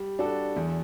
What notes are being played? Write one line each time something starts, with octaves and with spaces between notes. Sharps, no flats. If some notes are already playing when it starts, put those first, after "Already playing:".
Already playing: G3
D4 F#4 A4
E2